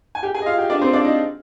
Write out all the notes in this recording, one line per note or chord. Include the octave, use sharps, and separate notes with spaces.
G#5
G4 G5
G#4 G#5
D#5
F4 F5
G4 G5
D4 D5
C4 C5
D4 D5
D#4 D#5